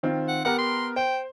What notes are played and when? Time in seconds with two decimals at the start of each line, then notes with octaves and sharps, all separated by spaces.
0.03 D#3 C4 F4
0.28 F#5
0.45 B3 G4 A#4 F#5
0.59 C6
0.96 C5 G5